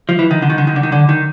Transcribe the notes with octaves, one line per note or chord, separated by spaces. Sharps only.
F3
E3
D#3
D3
D#3
D3
D#3
D3
D#3
D3
D#3